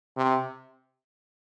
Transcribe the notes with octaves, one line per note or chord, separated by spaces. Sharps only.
C3